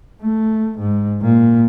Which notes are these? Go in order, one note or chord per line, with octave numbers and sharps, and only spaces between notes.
A3
G#2
A#2